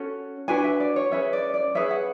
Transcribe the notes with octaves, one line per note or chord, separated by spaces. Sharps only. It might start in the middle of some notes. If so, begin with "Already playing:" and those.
Already playing: C#4 F#4 A4
D4 F#4 B4 G#5
E5
D5
C#5
C#4 G#4 B4 E5
D5
D5
C#4 G#4 B4 E5
F#5